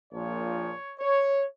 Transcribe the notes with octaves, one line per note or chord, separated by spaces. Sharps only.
A#1 A#2 F3 C#5
C#5